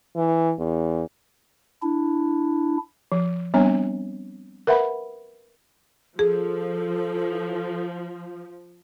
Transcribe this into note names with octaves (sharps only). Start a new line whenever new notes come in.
E3
E2
D4 E4
F3
G3 B3 C4 D4 C#5
A#4 B4 E5 F#5 B5
F3 G#4 A4